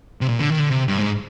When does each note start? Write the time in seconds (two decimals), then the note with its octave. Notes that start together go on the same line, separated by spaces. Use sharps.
0.21 C3
0.29 A#2
0.39 D3
0.50 D#3
0.59 D3
0.70 C3
0.88 G2
0.98 G#2